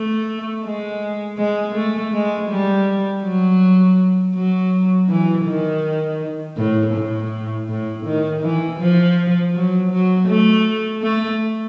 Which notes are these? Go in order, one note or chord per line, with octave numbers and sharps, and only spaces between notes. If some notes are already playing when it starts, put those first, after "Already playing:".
Already playing: A3
G#3
G#3
A3
G#3
G3
F#3
F#3
E3
D#3
A2
A2
A2
D#3
E3
F3
F#3
F#3
A3
A3